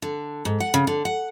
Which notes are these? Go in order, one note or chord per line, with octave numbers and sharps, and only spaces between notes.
D3
G#2
F#5
C#3
D3
F#5